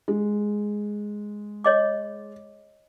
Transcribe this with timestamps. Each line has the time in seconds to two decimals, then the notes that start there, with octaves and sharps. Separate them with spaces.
0.08 G#3
1.64 C#5 D#5 D6